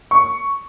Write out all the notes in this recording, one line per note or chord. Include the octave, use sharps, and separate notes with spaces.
C#6